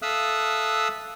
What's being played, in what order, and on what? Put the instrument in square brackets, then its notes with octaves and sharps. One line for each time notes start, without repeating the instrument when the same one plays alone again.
[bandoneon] A4 E5 F5 D#6 E6 F#6